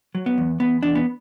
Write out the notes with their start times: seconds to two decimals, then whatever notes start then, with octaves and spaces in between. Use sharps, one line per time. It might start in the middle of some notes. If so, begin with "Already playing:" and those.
0.15 F#3
0.26 B3
0.38 E2
0.60 E2 B3
0.83 E2 D4
0.95 B3